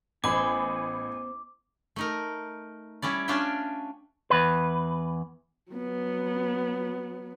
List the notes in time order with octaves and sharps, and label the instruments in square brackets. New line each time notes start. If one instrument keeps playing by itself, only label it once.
[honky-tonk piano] A1 B5 [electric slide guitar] B3 C5 [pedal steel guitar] G#5 [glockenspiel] D6
[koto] A3 D#4 A#4
G3 C#4 E4 D5
C#4 D4 F4 D5 E5 G5
[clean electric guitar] E2 B4
[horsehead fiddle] F#3 B3